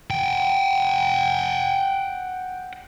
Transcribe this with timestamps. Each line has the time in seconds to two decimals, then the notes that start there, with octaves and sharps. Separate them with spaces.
0.11 F#5 G5